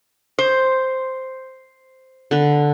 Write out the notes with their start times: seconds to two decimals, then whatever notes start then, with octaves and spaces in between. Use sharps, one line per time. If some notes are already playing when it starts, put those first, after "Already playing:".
0.39 C5
2.31 D3 B4